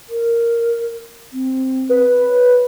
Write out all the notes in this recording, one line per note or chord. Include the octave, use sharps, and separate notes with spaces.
A#4
C4
B4
C#5